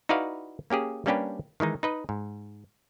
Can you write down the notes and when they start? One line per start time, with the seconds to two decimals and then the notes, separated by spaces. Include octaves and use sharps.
0.09 D#4 E4 F#4 B4 D5 F5
0.70 A#3 C#4 G4 G#4
1.06 G3 A#3 C#4 D4 G4 B4
1.60 D#3 E3 G#3 D#4
1.83 D#4 B4 D#5
2.09 G#2